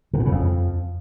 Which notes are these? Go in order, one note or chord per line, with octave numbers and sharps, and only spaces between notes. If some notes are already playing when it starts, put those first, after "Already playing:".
C3
A#2
C#3
F2